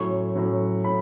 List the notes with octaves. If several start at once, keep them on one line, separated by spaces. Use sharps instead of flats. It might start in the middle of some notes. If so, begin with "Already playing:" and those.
Already playing: A2 F#3 C#4 C#6
A2 F#3 C#4
A2 B5